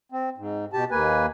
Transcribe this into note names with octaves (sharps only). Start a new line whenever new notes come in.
C4
G#2
B2 G4 A5
D#2 A#3 B4 G#5